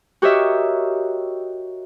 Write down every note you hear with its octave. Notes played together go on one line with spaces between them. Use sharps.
F#4 G4 A#4 C#5 D#5 E5